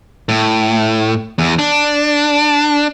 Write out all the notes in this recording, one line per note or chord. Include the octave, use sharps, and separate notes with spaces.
A2
E2
D4